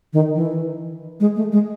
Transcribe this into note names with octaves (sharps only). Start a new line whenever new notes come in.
D#3
E3
G#3
A3
G#3